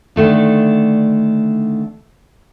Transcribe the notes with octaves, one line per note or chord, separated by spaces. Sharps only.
D3 D#3 A3 D4